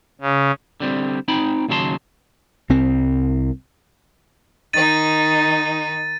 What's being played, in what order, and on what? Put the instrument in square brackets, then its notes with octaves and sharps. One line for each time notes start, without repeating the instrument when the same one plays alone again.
[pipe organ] C#3
[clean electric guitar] D3 G3 C4
C4 D#4 G5 B5
D#2 C#3 F#3 A4 A5 C6
[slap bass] C2 C4
[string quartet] D#3 D#4 [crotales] A6 D#7